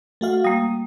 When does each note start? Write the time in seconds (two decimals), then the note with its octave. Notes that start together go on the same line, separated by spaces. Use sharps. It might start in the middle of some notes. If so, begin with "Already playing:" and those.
0.21 A3 F#4 F5
0.44 G3 A#3 D#6